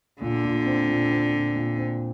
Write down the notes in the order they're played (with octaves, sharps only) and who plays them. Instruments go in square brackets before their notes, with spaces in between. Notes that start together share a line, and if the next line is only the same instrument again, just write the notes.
[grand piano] A#2 [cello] D3
[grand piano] A#2
C4
A#2
C4
A#2
A#2
C4